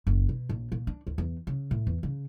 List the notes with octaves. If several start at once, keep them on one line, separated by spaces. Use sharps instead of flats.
F#1
B2
A#1
A#2
D4
D2
E2
C#3
A2
E2
C#3